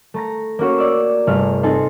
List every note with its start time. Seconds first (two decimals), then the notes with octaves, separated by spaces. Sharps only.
0.14 A3 A#5 A#6
0.59 A#3 C#4 F#4 C#5
0.78 D5 E6
1.27 G1 C3 A3 G#4 F6
1.63 C4 D#4 G#4 A4